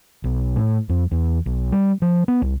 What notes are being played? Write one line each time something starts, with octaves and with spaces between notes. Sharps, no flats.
B1
A2
F2
E2
B1
G3
F3
B3
C2